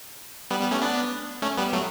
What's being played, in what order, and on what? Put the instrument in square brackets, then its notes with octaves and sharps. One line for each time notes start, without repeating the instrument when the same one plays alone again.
[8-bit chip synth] G3 B3
G3 B3
A3 C#4
B3 D4
A3 C#4
G3 B3
F#3 A3